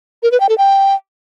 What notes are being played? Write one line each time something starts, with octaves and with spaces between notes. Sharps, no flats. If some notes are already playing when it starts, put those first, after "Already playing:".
A#4
B4
G5
A4
G5